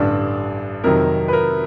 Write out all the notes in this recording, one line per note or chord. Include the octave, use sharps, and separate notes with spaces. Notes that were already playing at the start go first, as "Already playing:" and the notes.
Already playing: A1 G2 D3 D4 D5
F2 C3 D#3 F#3 A#4
B4
A#4